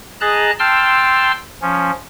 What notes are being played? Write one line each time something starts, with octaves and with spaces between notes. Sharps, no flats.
G#4 D#5 A5 A#5 F#6
G5 A5 C6 E6 F6
F3 C#4